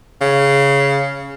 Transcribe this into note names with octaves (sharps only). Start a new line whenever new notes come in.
C#3